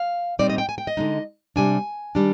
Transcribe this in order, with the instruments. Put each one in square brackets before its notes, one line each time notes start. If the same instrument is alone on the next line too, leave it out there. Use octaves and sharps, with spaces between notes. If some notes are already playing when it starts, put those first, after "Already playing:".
Already playing: [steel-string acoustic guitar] F5
A#2 G3 C4 D#4 D5
D#5
G5
G#5
G5
D#5
D3 G#3 D#4
C3 G3 D4 G#5
D#3 G3 D4